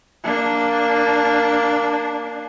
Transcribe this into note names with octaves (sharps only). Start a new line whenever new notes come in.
A#3 D4